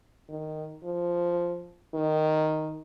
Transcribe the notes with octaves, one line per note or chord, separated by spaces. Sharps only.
D#3
F3
D#3